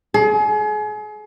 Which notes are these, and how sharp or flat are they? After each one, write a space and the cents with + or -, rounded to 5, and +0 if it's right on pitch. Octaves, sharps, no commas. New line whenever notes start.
G#4 +35 D5 -10